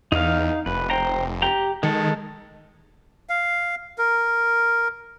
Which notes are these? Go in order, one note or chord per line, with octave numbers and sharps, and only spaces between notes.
E2 D#4 F5
F1 B4
C5 G5 A#5
G4 G5 A#5
D#3 G#3 A4
F5
A#4